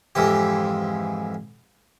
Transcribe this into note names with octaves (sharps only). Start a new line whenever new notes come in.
F2 G#2 E3 G4